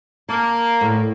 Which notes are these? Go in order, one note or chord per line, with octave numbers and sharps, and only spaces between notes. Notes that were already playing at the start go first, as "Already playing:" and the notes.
A#3 A5
A2